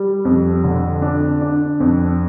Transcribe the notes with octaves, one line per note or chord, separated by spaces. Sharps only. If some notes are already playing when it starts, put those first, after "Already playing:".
Already playing: G3
F2
D3
D4
D4
F2